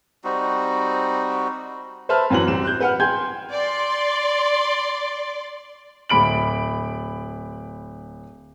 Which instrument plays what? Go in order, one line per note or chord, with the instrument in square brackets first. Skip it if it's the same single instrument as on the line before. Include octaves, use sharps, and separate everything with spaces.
[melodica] G3 C4 D#4 F#4
[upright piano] B4 C5 E5 A5 B5 F6
F#2 E3 F#3 F#4 B4 F#7
C2 C4 E7
F#6 G6
B4 F#5 F6
G5 G#5 C6 G6 G#6
[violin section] D5 C6
[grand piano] D1 B5 D7 F#7